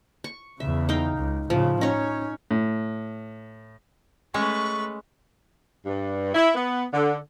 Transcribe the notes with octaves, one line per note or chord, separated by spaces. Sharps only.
C#6
E2 C#3 E5
D#4 F5 G5
C#2
A2 C#3 F3
C#4 D#4 C#5
A2
G#3 A3 C#4 B4 C#6
G2
E4
B3
D3